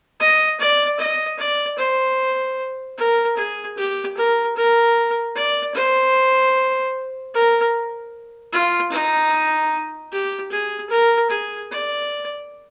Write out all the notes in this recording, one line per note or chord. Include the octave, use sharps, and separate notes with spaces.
D#5
D5
D#5
D5
C5
A#4
G#4
G4
A#4
A#4
D5
C5
A#4
F4
D#4
G4
G#4
A#4
G#4
D5